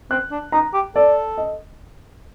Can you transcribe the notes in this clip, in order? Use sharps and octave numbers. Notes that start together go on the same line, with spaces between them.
C4 F#6
D4
D#4 A#5
G4
A4 D5
D#5